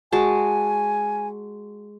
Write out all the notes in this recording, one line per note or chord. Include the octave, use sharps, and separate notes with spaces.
G#3 F#4 G#5 A5